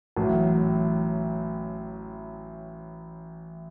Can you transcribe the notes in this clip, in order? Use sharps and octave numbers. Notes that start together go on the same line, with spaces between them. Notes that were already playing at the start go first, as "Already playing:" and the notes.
A1 A2 F#3